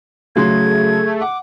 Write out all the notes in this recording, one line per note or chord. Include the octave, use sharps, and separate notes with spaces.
C#3 F#3 A3 G#4 C6 G#6
F#5 D6